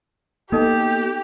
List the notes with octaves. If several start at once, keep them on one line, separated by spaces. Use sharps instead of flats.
A#3 B3 D#4 G4 A4 D#5